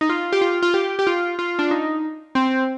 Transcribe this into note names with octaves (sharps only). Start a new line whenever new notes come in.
D#4
F4
G4
F4
F4
G4
G4
F4
F4
D4
D#4
C4